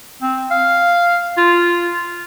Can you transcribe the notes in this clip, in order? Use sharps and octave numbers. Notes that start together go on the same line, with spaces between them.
C4
F5
F4